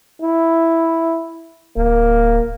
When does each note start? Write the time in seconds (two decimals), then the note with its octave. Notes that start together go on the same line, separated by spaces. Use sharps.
0.22 E4
1.76 D1 A#3